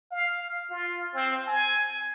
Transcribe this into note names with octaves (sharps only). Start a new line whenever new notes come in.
F5
F4
C4
G#5